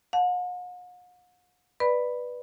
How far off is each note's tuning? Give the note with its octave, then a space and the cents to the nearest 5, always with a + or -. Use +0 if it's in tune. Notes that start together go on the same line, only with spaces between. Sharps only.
F#5 -45 A5 -5
B4 -5 D5 +15 B5 +0